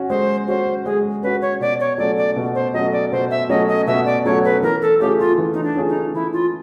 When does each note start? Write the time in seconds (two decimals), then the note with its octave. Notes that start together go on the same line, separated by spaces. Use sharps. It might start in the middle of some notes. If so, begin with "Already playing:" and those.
Already playing: C#4 F#4
0.10 G#3 C5
0.48 C#4 F#4 C5
0.86 G#3 G#4
1.23 C#4 F#4 B4
1.42 C#5
1.61 B2 D5
1.80 C#5
1.98 F#3 A3 C#4 D5
2.17 D5
2.36 B2
2.55 C5
2.74 F#3 A3 C#4 D#5
2.92 D5
3.12 B2 C5
3.31 E5
3.49 F#3 A3 C#4 D#5
3.68 D#5
3.87 B2 E5
4.06 D5
4.25 F#3 A3 C#4 C#5
4.45 B4
4.63 E3 A#4
4.82 A4
5.00 A3 C#4 F4 G4 G#4
5.19 F4
5.38 E3
5.54 D#4
5.64 D4
5.75 A3 C#4 F4 G#4
5.88 D#4
6.14 E3 E4
6.33 F4